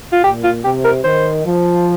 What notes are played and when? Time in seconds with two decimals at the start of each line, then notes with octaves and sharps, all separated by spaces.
0.13 F4
0.24 A#2 G4
0.44 F4
0.64 C3 G4
0.84 A#4
1.04 D#3 C5
1.45 F3